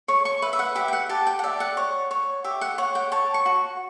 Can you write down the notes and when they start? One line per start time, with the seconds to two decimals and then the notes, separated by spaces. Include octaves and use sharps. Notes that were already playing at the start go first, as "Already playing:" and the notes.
0.08 C#5 C#6
0.25 C#6
0.42 B4 E5
0.53 E5
0.59 F#5
0.75 G4 E5
0.88 G5
0.93 F#5
1.09 G4 A5
1.27 G5
1.39 F#5
1.44 D5 E5
1.60 F#5
1.77 C#5
2.11 C#5
2.44 G4 E5
2.61 F#5
2.78 C#5 F#5
2.95 G5
3.12 C#5 A5
3.34 C#6
3.46 F#4